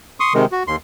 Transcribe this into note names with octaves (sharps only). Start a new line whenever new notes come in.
C6 C#6 D#6
C3 D#3 G#3
F#4
D#2 C6